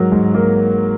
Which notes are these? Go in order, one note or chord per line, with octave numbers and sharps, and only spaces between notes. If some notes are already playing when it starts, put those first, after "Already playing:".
Already playing: G#2 F#3 A#4
G#2
A#3